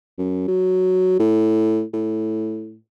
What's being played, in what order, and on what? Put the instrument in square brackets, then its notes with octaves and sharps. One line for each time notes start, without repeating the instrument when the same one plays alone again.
[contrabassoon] F#2
F#3
A2
A2